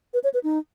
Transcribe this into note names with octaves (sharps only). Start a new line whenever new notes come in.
B4
C#5
B4
D#4